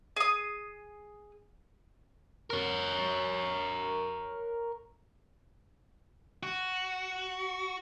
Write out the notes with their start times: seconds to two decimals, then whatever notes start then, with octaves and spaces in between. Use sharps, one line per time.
0.16 G#4 D#6
2.50 A#4 C#5
6.43 F#4